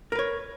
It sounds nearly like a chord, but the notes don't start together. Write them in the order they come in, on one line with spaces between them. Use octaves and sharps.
A#4 B4 C#5